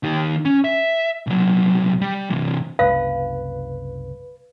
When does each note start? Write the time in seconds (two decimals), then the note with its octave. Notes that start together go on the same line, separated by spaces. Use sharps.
0.03 D#3 G4
0.45 C#4
0.64 E5
1.27 C2 F#3
2.01 G3
2.30 C3 E3
2.79 F#1 C2 B4 F5